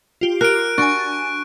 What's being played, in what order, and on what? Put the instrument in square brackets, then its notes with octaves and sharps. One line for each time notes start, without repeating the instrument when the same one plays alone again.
[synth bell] F4 G4
[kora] A#4 [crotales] F#6 D7
[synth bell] D4 G#5 [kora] F#4 [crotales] C#6